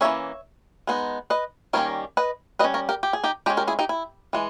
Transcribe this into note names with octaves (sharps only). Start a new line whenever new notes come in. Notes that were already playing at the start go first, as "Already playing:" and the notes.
E3 A#3 C#4 C#5 E5
G#3 B3 D#4
B4 D#5
D#3 G3 A#3 C#4 A#4 C#5
B4 D#5
G3 C#4 B4 D#5
A#4 C#5
G4 A#4
G4
G#4
D#4 G4
G#3 C#4 D#4 G4
G4 A#4
E4 G#4
D#4 G4
E4
E3 G#3